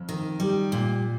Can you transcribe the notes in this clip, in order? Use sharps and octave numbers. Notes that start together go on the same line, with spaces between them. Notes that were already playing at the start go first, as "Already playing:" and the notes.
Already playing: F2
D#3
G3
A#2